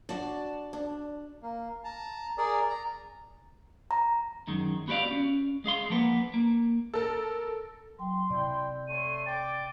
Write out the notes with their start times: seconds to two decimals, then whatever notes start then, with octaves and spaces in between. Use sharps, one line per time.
0.09 D4 F#4 D5 A5
0.73 D4
1.42 A#3
1.84 A5 A#5
2.38 G#4 A#4 D5
2.69 A#5
3.91 A#5
4.47 F#2 D#3 G#3
4.88 B3 F#4 G4 C#5 D5 F5
5.11 C#4
5.64 G#3 G#4 F5 C6
5.90 F3 A#3 B3
6.34 A#3
6.94 A4 A#4
7.99 F#3 G5 C6
8.30 C3 E4 D5 G5
8.88 A3 C#5 C6 D#7
9.26 G5 D6 A6